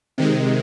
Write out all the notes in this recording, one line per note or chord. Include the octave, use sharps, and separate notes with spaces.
C3 D#3 G#3